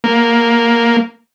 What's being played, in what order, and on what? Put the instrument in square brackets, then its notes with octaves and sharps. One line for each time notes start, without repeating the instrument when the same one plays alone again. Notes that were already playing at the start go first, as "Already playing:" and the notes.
[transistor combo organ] A#3